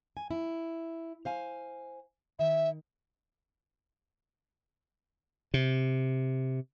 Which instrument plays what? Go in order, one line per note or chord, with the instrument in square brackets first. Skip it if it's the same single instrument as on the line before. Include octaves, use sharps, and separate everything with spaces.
[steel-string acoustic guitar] G#5
E4
C5 F5 G#5
[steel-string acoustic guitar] D#3 [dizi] E5
[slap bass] C3